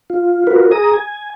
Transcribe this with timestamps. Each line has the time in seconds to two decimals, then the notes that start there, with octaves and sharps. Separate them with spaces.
0.10 F4
0.47 F4 F#4 A#4 B4
0.71 G#4 A#5 D#6
0.93 G#5